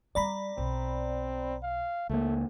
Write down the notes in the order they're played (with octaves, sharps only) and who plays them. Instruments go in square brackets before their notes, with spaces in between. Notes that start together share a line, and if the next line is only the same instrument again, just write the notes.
[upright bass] G3 C4 [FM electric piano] D5 A#5 B5
[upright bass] B1 [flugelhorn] C4
[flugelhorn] F5
[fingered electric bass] C#2 A#3 [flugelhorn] A3